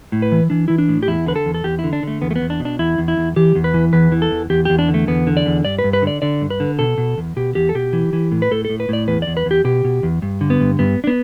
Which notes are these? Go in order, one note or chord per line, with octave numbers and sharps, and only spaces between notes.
A2
B4
E3
E3 D4
E3 E4
D4
A2
G4
E2 E4
D3 B4
A4
E2
A4
E2 G4
E4
D3
D4
D3 A3
E2 B3
A3
B3
E2
D4
B2
D4
E2 E4
E2
E4
E2
E3 G4
E2
B4
E3
E2 B4
E3
A4
E2
E2 G4
E2 G4
D4
D3
A3
E2 B3
D3
D5
E2
G2 D5
B4
G2
B4
D3 D5
D3 D5
G2
B4
D3
B2 A4
B2
E2
B2 G4
E2 G4
A4
B2 G4
E3
E3
A2
B4
A2 A4
A2 A4
B4
A2 D5
E2 B4
E2 D5
B4
E2 G4
B2 G4
B2
E2
G2
D3
B3
G2
G2 B3
D4
B3